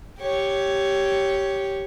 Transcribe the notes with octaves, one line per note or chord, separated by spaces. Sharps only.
G4 C#5